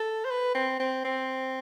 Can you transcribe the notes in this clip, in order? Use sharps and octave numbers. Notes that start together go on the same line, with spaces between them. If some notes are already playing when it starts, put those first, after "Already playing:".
Already playing: A4
C5
B4
C4
C4
C4